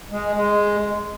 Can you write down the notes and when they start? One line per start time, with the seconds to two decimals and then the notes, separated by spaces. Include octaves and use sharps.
0.12 G#3
0.36 G#3